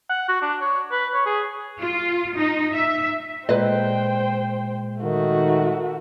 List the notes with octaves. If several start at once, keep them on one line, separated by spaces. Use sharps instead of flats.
F#5
F#4
D4
C#5
B4
C#5
G#4
F4
D#4
E5
A#2 G#3 B4 C5 D#5 G5
D#3 A3 F#4